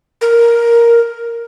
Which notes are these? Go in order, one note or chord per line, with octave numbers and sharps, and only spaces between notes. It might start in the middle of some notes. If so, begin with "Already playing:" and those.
A#4